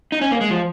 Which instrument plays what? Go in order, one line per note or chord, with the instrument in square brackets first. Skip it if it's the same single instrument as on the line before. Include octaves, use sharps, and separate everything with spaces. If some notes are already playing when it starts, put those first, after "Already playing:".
[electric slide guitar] D#4
C#4
A#3
G#3
F3